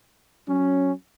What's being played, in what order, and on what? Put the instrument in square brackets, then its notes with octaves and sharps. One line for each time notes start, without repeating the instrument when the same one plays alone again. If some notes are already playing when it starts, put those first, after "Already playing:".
[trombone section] F#3 C#4